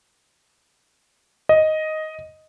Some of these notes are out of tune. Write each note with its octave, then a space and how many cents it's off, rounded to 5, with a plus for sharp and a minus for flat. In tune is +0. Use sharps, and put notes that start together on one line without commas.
D#5 +5